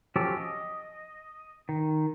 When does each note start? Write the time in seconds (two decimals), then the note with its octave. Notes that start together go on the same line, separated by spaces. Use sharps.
0.16 F3 F#3 C#4 G4 A4
0.37 D#5
1.69 D#3